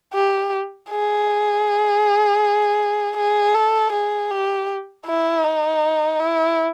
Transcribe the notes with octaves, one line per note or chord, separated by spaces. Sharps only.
G4
G#4
G#4
A4
G#4
G4
E4
D#4
E4